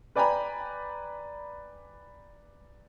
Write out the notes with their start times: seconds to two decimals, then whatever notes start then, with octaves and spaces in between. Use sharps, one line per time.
0.15 B4 D5 G5 G#5 A#5 B5